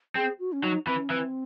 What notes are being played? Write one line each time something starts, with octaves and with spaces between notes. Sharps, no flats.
C4 G#4
F#4
C#4
F#3 D#4
E3 C4
C#4
E3 C4